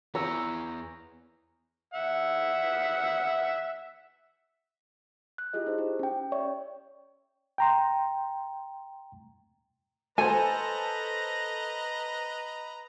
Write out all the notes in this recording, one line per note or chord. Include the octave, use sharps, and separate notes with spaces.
E2 E3 C#5 A#5 E6
E5 F#5
F#6
E4 F4 G4 G#4 D#5
D#4 C5
G4
C#4 G5
C#5 D5 E5 G5 C#6
G5 A#5 C6
A4 B4 C5 D#5 G#5 A#5